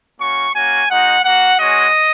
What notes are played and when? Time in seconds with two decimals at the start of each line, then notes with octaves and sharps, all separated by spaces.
0.19 A#3 C#4 F#4 C#6
0.55 A#3 C#4 F#4 G#5
0.90 G#3 D#4 F#4 F#5
1.24 A#3 F#4 F#5
1.60 G#3 C#4 F#4 D#5